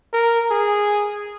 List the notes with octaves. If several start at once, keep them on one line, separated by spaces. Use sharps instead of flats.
A#4
G#4